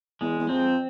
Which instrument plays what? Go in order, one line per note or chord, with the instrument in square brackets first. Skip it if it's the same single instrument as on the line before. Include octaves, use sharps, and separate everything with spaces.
[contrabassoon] E2 [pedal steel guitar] G#3
[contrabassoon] E2
[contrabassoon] F2 [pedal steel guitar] C4